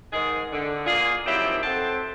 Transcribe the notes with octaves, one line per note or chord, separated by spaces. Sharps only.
G#2 D#3 G#4
D3
A#3 F4 G#4
D#3 F3 F#3 C4 E4 G4
C4 A4 F#5 G5 A5 C6